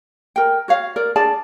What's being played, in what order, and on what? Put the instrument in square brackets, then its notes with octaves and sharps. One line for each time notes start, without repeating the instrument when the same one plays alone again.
[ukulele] A#4 G5
F#4 C#5 F5
A#4 D5
D4 G#4 D5 A5